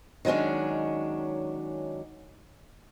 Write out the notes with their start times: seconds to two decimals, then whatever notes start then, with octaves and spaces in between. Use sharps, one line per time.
0.25 D#3 F#3 G#3 C#4 D4